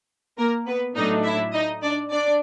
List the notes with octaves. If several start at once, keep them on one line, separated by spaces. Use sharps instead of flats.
A#3 A#4
B3 B4
A2 F#3 A3 D4 D#4 D#5
E4 E5
D#4 D#5
D4 D5
D4 D5